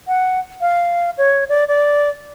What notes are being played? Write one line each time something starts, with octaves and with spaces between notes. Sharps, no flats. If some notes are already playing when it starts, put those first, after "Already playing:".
F#5
F5
C#5
D5
D5